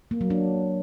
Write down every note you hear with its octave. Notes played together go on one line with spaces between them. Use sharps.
A#3
F#3
D4